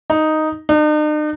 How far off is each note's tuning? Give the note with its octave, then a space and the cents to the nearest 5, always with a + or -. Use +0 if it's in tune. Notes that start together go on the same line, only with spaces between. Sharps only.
D#4 +0
D#4 -45